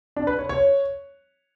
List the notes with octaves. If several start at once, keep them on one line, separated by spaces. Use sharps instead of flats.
D4
B4
C#5
C#5